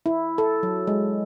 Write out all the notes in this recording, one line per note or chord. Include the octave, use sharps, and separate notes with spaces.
E4
A4
F#3
G#3